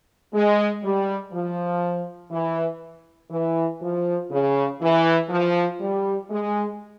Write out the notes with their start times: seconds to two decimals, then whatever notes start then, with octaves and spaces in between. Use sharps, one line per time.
0.34 G#3
0.83 G3
1.33 F3
2.32 E3
3.31 E3
3.81 F3
4.31 C#3
4.81 E3
5.30 F3
5.81 G3
6.30 G#3